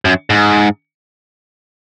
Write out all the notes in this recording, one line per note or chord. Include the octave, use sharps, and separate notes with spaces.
F#2
G#2